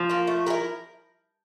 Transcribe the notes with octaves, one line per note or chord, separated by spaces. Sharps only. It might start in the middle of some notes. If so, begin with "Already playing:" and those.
Already playing: F3
A#3 F4
A3
E4 G4 A#4